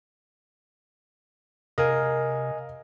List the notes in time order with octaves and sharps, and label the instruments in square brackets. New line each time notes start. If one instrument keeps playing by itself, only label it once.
[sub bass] C3 [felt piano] A#4 [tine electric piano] D#5 F5 G#5